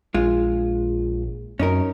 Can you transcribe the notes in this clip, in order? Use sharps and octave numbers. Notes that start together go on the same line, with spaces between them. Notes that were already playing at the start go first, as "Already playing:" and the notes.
A#1 G#3 F4
F#2 C#4 D#4 A#4